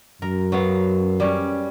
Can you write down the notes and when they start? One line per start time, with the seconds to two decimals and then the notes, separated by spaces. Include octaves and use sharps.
0.22 F#2 A#4
0.52 F#3 B3 F5
1.20 G3 C#4